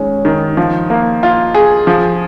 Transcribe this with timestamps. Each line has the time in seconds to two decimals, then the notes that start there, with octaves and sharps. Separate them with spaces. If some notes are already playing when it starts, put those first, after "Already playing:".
Already playing: D#3 G#3 C#4
0.25 D#3
0.57 F3
0.90 A#3
1.23 F4
1.54 G#4
1.87 F3